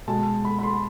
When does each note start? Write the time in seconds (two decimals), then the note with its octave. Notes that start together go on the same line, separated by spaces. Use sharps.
0.08 B2 G#3 A5
0.45 B5
0.59 B5
0.63 C6